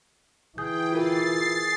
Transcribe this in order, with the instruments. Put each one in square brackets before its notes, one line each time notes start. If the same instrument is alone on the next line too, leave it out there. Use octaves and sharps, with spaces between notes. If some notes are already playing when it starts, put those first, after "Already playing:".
[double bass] E3 [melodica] G#4 [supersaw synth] G5 [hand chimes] G6
[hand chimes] F4 A#4 [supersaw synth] A6 C7